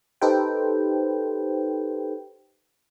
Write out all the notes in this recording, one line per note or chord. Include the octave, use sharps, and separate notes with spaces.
D#4 G4 A4 B4 C5 G5